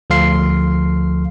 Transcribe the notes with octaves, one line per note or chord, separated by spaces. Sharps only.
D2 F3 A4 F5 C6 C7